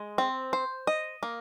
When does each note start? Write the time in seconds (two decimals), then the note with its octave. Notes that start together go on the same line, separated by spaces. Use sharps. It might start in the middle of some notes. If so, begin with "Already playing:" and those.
Already playing: G#3
0.18 C4
0.53 C5
0.87 D#5
1.23 A#3